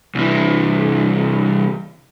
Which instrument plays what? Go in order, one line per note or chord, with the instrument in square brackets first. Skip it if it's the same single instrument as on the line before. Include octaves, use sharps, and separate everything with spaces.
[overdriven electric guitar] C2 E3